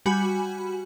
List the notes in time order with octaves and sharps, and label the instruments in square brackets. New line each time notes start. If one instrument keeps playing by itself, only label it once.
[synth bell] G3 F#4 G#5 B5